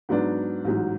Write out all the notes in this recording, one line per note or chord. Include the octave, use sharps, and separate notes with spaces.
G#2 F#3 B3 D4
A1 G#2 F#3